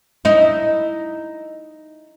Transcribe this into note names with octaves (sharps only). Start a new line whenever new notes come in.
D#4 E4